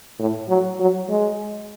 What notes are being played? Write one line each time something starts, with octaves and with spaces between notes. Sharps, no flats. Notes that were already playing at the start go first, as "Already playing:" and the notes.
A2
F#3
F#3
G#3